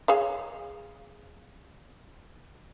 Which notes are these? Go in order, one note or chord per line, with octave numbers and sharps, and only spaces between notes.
G#4 C#5 F5